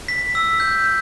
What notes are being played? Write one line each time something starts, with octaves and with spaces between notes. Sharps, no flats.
B6
E6
G6
G6